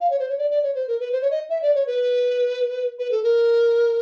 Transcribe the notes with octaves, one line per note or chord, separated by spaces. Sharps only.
F5
C#5
C5
C#5
D5
D5
C#5
C5
A#4
B4
C5
C#5
D#5
E5
D5
C#5
B4
B4
A4
A#4